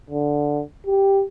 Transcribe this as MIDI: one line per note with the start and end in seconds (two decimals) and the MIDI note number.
0.10 0.62 50
0.87 1.24 67